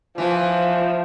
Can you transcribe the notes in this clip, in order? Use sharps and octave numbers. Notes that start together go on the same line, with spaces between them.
E3 F3